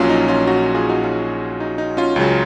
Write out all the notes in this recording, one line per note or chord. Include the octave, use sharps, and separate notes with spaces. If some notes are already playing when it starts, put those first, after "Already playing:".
Already playing: A#1 A#2 F#3 C#4 F4
D#4
C#4 F4
D#4 F#4
F4 G#4
D#4 F#4
C#4 F4
D#4
D#4
C#4 F4
C#2 C#3 F#3